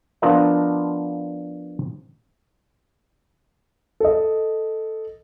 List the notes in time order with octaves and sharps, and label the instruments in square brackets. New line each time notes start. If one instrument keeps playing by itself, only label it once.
[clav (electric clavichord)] F3 B3 D4 F4 A#4 D#5
[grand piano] A4 D#5